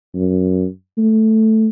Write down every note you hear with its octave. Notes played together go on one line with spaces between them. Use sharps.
F#2
A3